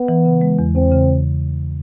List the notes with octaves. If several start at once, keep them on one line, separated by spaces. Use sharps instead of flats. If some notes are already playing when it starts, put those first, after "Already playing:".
Already playing: B3
E3
C#3
G#3
E2
E2 C4
C#3